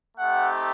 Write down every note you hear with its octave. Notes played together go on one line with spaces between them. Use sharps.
A3 C4 D#4 G4 F#5